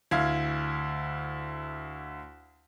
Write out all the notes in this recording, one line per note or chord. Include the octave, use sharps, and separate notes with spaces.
D2 E4 F5 G#6